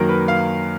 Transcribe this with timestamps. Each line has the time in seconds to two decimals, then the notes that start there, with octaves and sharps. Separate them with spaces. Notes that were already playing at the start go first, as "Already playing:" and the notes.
Already playing: F#2 D#3 F#3 A#3 A#4
0.09 B4
0.28 F5